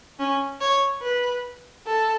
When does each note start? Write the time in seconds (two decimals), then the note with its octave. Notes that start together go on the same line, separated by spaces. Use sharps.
0.20 C#4
0.61 C#5
1.03 B4
1.87 A4